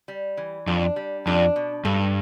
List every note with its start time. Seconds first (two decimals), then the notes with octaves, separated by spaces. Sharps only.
0.08 G3
0.37 E3
0.67 F2 D4
0.96 G3
1.27 F2 D4
1.56 B2
1.85 G2 A4